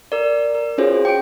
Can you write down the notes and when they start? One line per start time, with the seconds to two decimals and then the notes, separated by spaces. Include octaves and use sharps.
0.12 A#4 D5
0.55 A#4
0.78 C#4 F4 F#4 G#4 C5 C#5
1.05 G5 D6 D7